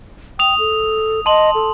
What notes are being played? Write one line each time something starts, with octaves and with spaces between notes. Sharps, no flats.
G5 D#6 F7
A4
D#5 A5 C6 F#7
A4